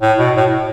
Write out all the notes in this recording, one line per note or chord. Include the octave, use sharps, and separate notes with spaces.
A2
B2
A2